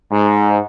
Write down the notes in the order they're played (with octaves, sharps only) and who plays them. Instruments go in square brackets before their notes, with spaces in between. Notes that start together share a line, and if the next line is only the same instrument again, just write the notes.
[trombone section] G#2